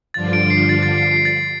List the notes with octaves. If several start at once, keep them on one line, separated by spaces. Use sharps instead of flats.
G2 D3 F3 D4 F4 A6
D7
C7
A6
A6
C7
C7
A6